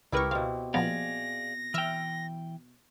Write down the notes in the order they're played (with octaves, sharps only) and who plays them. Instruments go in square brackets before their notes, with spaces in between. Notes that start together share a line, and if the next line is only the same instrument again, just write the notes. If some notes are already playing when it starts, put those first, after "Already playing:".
[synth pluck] C#2 B4 C#6 [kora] E4 G4 A#4
[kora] B2 C4 [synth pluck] F5
[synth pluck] A#2 F3 B3 [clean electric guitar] G#4 D5 F5 [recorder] A#6
[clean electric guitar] E3 G5 [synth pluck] E5 F6